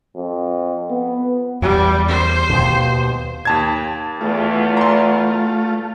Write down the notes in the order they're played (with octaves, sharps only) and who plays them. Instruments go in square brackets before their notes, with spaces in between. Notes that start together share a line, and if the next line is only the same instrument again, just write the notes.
[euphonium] F2
B3
[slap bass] E2 [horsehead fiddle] G3
[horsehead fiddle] C5
[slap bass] D#2 B2
[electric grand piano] D#2 A5 G#6
[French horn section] E2 [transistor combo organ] A3 F4
[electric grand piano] A#5 C6